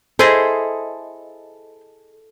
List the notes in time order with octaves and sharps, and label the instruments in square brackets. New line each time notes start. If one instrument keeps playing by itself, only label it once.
[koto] E4 G#4 D#5 [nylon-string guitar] A4 [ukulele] C5